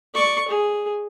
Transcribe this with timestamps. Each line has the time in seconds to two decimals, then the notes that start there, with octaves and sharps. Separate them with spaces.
0.14 D5 C#6
0.48 G#4